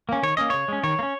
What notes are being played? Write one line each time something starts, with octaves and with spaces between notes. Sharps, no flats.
A#3 C#4
D#3 C#5
A#3 C#4 D#5
C#3 C#5
G#3 C#4
D#3 C#5
A#3
C#4